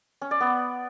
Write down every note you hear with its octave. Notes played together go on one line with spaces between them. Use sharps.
C#4
D5
B3